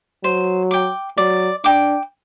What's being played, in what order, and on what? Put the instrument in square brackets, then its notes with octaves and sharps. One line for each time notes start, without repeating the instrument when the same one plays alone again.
[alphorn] F#3 [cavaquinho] C5
[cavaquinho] G5 D6
[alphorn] F#3 [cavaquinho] D5
[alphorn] D4 [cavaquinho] G5 D6